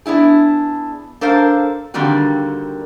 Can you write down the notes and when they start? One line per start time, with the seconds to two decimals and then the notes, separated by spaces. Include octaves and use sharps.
0.06 B3 D4 E4 G#4
1.21 D4 A4 A#4 C5 F5
1.94 D3 D#3 G3 A#3 C4 F#4